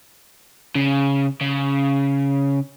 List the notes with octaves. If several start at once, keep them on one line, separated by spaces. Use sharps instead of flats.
C#3
C#3